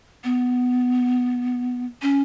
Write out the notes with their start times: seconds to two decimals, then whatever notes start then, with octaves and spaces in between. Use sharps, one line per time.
0.24 B3
2.02 C#4